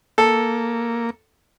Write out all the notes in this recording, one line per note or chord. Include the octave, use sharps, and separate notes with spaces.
A#3 A4